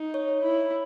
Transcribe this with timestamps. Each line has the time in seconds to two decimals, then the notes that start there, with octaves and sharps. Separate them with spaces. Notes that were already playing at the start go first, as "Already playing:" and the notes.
Already playing: D#4
0.14 C#5
0.29 C#5
0.42 E4